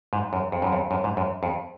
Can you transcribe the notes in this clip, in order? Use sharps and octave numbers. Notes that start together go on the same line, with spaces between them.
G#2
F#2
F2
F#2
F2
F#2
G#2
F#2
F2